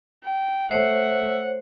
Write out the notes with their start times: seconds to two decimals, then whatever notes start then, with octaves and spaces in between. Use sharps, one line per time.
0.24 G5
0.71 A3 C5 C#5 E5 F#5